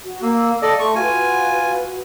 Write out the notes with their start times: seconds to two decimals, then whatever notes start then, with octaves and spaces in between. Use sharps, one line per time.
0.03 F#4
0.22 A#3 F5 E6
0.62 A4 D5 D#5
0.80 A3 C6 C#6
0.95 F4 F#4 B4 G#5